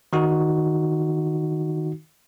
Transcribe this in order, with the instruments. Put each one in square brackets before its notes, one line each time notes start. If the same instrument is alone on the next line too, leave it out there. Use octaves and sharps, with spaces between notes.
[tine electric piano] D#3 D#4 F#4